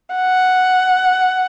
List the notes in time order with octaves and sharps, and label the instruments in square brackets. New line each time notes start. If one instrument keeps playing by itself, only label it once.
[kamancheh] F#5